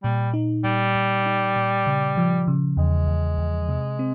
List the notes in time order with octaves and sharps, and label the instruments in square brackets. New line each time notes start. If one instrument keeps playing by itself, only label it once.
[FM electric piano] A#2 [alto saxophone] G3
[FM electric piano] D#4
[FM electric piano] A#2 [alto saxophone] G3
[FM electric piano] A#2
D#4
A#2
C#3
F3
C#3
[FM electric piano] E2 [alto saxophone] G#3
[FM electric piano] E2
E2
C3
C4